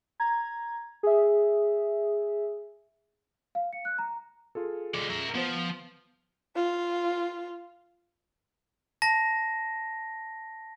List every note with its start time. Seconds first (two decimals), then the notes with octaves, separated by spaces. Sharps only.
0.20 A#5 G#6
1.03 G#4 E5
3.55 F5
3.73 C#7
3.85 F#6
3.99 A#5
4.55 F4 G#4 A4
4.94 G#3 D5
5.10 A#4 E5
5.35 F3 B3 C5
6.56 F4
9.02 A5 A#6